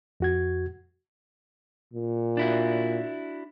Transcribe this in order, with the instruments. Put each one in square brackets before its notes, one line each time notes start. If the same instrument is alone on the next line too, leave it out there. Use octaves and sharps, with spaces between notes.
[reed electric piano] F2 F#4 G#6
[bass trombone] A#2
[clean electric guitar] D4 E4 F#4